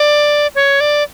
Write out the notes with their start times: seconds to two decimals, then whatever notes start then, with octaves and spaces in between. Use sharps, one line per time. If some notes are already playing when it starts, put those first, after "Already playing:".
Already playing: D5
0.55 C#5
0.80 D5